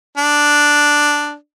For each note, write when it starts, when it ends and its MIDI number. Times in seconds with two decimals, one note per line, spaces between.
0.18 1.34 62